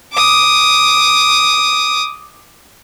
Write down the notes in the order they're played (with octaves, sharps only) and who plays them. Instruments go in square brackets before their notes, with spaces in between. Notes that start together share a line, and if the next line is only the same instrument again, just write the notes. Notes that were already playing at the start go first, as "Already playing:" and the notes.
[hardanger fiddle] D6 D#6